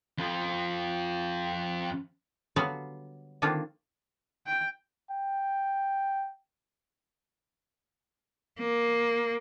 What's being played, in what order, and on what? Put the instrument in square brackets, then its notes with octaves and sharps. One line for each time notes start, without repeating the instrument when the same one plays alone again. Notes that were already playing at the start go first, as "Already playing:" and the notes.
[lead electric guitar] F2 F4
[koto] D3 F#3 G3 B3 F#4 F5
D3 D#3 A#3 C4 D4 F4
[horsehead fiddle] G5
[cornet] G5
[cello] A#3